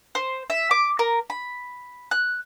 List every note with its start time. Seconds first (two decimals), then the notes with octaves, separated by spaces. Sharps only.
0.15 C5
0.50 E5
0.71 D6
0.99 A#4
1.30 B5
2.11 F#6